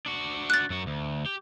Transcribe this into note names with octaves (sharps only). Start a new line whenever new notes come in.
D4 F#4
F#6 A6
F#2 F#4
D2
G4